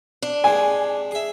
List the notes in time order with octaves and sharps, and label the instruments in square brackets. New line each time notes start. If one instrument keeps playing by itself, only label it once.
[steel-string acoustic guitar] D4
[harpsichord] C3 G#3 [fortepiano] G#5
[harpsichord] G#4 E5